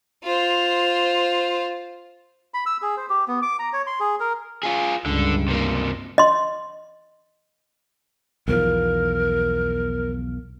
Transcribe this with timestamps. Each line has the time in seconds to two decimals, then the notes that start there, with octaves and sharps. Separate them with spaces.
0.23 F4 C5
2.54 B5
2.66 E6
2.82 G#4
2.97 C5
3.10 G4
3.28 B3
3.42 D6
3.59 A#5
3.73 C#5
3.87 C6
4.00 G#4
4.20 A#4
4.63 F4 G#4
5.06 C#2 G2 D3
5.48 C3 A#3
6.18 D#5 C6
8.48 B1 E2 F3 A#4